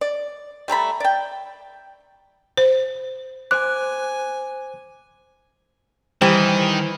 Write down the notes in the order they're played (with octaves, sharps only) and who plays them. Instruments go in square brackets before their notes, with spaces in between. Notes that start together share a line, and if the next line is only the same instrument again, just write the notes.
[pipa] D5
G3 A3 A#5 B5
D5 G5
[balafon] C5
[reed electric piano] C5 D6 [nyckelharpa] G#5 [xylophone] F#6
[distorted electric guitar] D#3 [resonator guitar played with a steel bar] E3 [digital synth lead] G3 [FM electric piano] C5